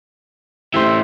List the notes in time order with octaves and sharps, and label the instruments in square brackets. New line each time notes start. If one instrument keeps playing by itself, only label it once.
[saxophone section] C3 C5 E5 [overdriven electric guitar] E3 A3